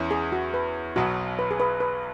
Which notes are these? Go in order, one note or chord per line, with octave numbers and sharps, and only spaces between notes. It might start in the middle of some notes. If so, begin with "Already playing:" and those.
Already playing: E2 E3 C#4 E4
G#4
F#4
B4
B1 B2 F#3 B3 F#4
B4
G#4
B4
B4